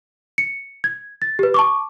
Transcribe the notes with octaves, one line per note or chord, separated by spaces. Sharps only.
C#7
G#6
A6
G4 B4
A5 C#6 D6